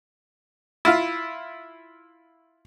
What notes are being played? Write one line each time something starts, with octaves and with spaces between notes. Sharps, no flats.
E4 F4 F5